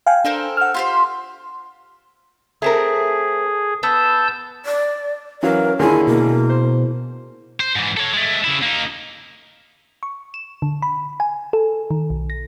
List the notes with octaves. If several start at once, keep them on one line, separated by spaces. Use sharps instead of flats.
F5 G5 G#5
D4 A4 A#4 C5
F#5 F6
F4 G4 C5
A3 C4 G#4 A#4
B3 A5 E6 G6
D5
E3 F#3 C#4 A#4 F5
D#2 D3 E4 G#4 A#4 G#5 C6
B2 A#3
C5
C5
G#2 E3
A4 C#5
G#3 A3
C#3 E4
A#3 D#4
C#6
E7
D3
B5
G#5
A4
D#3
B1
A#6